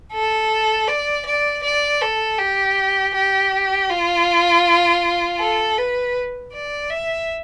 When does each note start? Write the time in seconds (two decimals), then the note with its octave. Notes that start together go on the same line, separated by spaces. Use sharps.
0.13 A4
0.88 D5
1.26 D5
1.63 D5
2.01 A4
2.38 G4
3.14 G4
3.90 F4
5.39 A4
5.78 B4
6.53 D5
6.90 E5